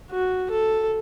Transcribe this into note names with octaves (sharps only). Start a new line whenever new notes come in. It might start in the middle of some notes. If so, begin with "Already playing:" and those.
F#4
A4